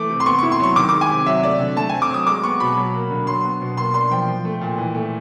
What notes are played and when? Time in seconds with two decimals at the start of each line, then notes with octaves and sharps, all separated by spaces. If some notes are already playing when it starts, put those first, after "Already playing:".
Already playing: E3 A3 D6
0.10 C3
0.20 C6
0.26 B3 C#6
0.39 E4 C#6
0.52 C6
0.60 F#3 C#6
0.76 D#3 D6
0.89 G#3 D6
1.01 G#5
1.10 C3
1.26 F#3 E5
1.43 A3 D5
1.60 D3
1.76 A3 A5
1.89 C4 G#5
2.02 D6
2.10 F#3 D#6
2.27 G#3 D6
2.43 B3 C#6
2.60 B2 B5
2.77 F#3
2.94 A#3
3.11 D3
3.27 F#3 C6
3.44 B3
3.61 B2
3.77 A#3 C6
3.94 D4 C6
4.11 F3 G5
4.28 F3
4.45 A3
4.61 A#2
4.78 E3
4.95 A3